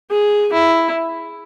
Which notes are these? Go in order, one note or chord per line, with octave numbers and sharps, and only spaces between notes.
G#4
E4